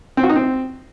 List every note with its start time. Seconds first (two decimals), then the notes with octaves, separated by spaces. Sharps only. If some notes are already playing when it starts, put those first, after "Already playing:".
0.17 C4
0.23 F#4
0.29 D#4
0.36 C4